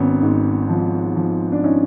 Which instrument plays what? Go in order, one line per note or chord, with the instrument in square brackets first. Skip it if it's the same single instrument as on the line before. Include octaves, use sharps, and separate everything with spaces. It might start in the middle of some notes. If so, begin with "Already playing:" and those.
Already playing: [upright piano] G#1 B3 C#4
G#2
F3
F3
D4
C#4 D#4